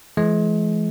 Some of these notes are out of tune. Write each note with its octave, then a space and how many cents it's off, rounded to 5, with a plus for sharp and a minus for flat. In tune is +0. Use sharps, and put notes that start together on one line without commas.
E3 +35 G#3 +35